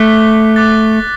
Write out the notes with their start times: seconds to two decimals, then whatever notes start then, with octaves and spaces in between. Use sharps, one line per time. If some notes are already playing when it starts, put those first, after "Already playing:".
Already playing: A3 D6 F#6 B6 G7
0.56 D6 F#6 A6